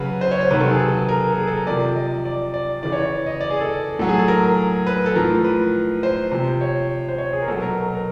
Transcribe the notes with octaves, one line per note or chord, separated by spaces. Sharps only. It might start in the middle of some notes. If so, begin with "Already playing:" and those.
Already playing: C#3 F#3 B4
C5
C#5
C5
C3 D#3 F#3 B4
A4
G#4
A4
A#4
A4
G#4
A4
A#4
C3 F3 D5
D#5
D5
D5
C#3 E3 D5
C#5
C#5
D#5
D5
G#4
A4
A2 F#3 A4
G#4
A4
A#4
B4
A4
A2 F3 A#4
B4
C5
C3 F3
C#5
C5
C#5
G#4
A#4
B2 F#3 A4
A#4
A#4